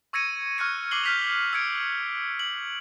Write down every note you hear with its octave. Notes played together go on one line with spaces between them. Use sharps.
C#6 E6 G#6 A#6 C#7 D#7
C#6 F6 F#6 G#6 C#7 D#7
D6 F6 C7 F#7 G7
F6 G6 B6 C7 F7
E6 F6 G#6 C#7 D7
F#7